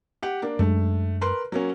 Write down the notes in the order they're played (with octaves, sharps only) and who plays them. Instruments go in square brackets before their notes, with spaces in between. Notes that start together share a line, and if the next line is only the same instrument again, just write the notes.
[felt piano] G4 F#5
A#3 D4
[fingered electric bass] F#2 G#3 D4 [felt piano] A3
[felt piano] A#4 B4 C6
F#3 A#3 C#4